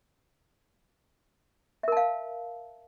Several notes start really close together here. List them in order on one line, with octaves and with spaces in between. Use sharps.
E5 A#4 A5 F5